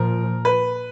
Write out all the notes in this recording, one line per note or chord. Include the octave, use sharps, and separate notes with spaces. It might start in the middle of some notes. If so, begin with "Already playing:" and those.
Already playing: A#2 F3 A#4
B4